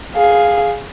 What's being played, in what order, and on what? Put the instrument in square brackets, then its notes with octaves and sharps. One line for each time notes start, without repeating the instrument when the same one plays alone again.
[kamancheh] G#4 F5